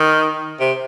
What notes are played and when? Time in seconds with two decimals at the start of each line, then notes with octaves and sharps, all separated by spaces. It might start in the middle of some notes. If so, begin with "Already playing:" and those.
Already playing: D#3
0.60 C3